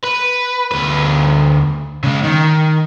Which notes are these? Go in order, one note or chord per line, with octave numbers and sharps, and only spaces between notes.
B4
D2 B4
C#3 G#3
D#3